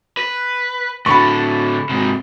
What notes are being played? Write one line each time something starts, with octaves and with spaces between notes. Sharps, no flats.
B4
A2 D3 B5 C#6
G#2 C3